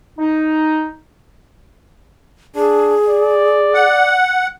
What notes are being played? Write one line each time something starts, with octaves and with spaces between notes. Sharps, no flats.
D#4
D4 G#4
D5
F#5